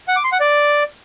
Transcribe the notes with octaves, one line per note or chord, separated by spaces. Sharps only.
F#5
D6
C6
F#5
D5